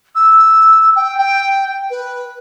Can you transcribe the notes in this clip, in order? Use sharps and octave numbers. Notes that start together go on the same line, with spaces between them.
E6
G5
G5
B4